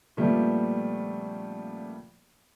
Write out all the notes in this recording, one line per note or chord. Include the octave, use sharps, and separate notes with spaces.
A#2 C#3 F3 G3 A3 B3